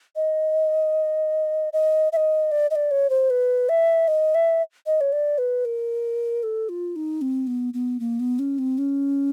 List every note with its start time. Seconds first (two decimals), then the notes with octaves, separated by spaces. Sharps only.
0.16 D#5
1.73 D#5
2.13 E5
2.16 D#5
2.51 D5
2.71 D#5
2.76 D5
2.91 C#5
3.10 C5
3.30 B4
3.69 E5
4.08 D#5
4.35 E5
4.86 D#5
5.01 C#5
5.12 D5
5.38 B4
5.65 A#4
6.43 A4
6.69 F4
6.96 D#4
7.22 C4
7.47 B3
7.74 B3
8.00 A#3
8.20 B3
8.39 C#4
8.58 C4
8.78 C#4